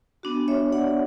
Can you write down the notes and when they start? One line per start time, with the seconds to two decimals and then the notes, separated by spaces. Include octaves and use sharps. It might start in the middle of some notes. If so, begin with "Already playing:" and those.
0.23 B3 D4 F#4
0.48 C#5 E5
0.72 D5 F#5